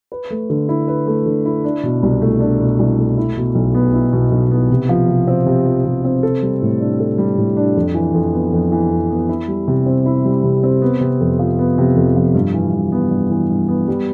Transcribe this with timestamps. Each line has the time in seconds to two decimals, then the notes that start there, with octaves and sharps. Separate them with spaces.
0.12 B4
0.30 A3
0.50 D3
0.69 E4
0.88 B4
1.07 A3
1.26 D3
1.45 E4
1.64 D4
1.83 B2
2.03 C2
2.22 A3
2.40 D4
2.60 B2
2.79 C2
2.99 A3
3.17 E4
3.36 B2
3.55 B1
3.74 B3
3.94 E4
4.13 B2
4.32 B1
4.51 B3
4.70 C3
4.89 F3
5.08 C3
5.27 C4
5.46 C3
5.66 F3
5.85 C3
6.04 C4
6.23 A4
6.42 G3
6.62 A2
6.80 D4
7.00 A4
7.18 G3
7.38 A2
7.57 D4
7.76 F2
7.95 E3
8.14 F2
8.33 B3
8.53 F2
8.72 E3
8.91 F2
9.10 B3
9.29 E4
9.48 G3
9.68 C3
9.86 C4
10.05 E4
10.25 G3
10.44 C3
10.63 C4
10.82 B3
11.01 C3
11.20 F2
11.39 F3
11.59 B3
11.78 C3
11.96 F2
12.16 F3
12.34 G2
12.54 E3
12.73 G2
12.92 B3
13.11 G2
13.31 E3
13.50 G2
13.68 B3
13.88 G3